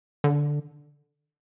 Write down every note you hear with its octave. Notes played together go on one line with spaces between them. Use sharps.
D3